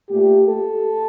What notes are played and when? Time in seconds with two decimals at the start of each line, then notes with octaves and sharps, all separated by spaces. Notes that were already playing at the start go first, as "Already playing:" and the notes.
0.10 A#2 A3 G4
0.49 A4